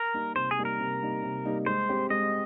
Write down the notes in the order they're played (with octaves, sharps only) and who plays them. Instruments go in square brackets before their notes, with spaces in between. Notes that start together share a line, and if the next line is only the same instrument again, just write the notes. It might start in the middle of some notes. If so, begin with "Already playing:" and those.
Already playing: [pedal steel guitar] A#4
[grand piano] G3 A#3 D#4
[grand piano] C3 [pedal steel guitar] C5
[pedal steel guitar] G#4
[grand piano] G3 A#3 D#4
[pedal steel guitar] A#4
[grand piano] C3
G3 A#3 D#4
C3
G3 A#3 D#4
[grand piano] G#3 [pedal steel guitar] C5
[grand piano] C4 G4
[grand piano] G#3 [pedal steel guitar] D#5